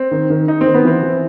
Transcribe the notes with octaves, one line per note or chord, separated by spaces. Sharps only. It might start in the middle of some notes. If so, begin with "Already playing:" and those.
Already playing: C4
D#3
D#3
D#3 D#4
C4
D#3
B3
E3 C4
E3